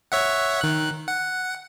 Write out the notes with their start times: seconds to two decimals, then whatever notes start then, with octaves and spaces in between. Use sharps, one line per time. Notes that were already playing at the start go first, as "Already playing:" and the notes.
0.12 C#5 E5 F#5
0.61 D#3 F#6
1.08 F#5